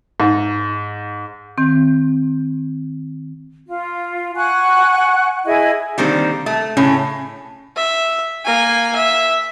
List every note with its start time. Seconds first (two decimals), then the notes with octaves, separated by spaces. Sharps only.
0.20 G#2
1.58 D#3 C4 G6
3.68 F4
4.36 F#5 G#5 C#6 F#6
5.46 E4 G#4 D#5 G#5
5.98 D3 D#3 G3 A#3 C4
6.46 A3
6.77 A2 C#3 C#4
7.76 E5
8.45 A#3 G#5
8.96 E5